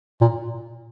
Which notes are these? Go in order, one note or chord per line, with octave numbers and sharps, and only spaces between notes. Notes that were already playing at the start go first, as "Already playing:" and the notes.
A#2